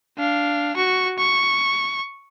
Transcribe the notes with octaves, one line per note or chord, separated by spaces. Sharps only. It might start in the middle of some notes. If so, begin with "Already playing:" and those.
D4 F5
F#4 C#6
C#6